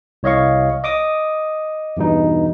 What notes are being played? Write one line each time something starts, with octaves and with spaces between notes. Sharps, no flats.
C2 C#5 D#5 F5 C#6
D#5 D6 D#6
E2 G2 B2 D#4